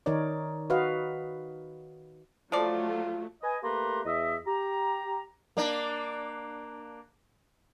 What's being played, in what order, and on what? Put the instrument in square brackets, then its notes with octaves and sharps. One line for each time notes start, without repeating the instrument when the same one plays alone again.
[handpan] D#3 D#4 A#4 C#5 D5
F#4 B4 D#5 F5
[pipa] F3 D5 [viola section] F#3 A3 [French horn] F4
[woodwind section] B4 D#5 G#5
A3 A#3 G4 B4 A#5 C6
E2 D#5 E5
G4 A#5
[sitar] A#3 D4